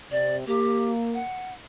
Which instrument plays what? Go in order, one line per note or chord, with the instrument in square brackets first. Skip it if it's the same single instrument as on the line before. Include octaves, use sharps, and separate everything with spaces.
[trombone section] C3 [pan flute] D5
[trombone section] A#3 [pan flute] G4
[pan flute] F#5